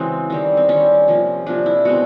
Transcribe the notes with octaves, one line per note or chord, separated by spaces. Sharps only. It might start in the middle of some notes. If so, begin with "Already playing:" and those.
Already playing: C#3 E3 G#3 C4 F#4 G#4
D#3 G3 C4
C4
D#3 G3 C4 C#4
C3 F3 A#3
C3 F3 A#3 D4
E4
B2 G#3 C4 F#4